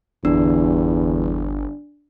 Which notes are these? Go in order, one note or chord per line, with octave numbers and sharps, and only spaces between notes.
G1 E2 D4